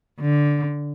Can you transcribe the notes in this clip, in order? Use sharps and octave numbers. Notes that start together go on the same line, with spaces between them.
D3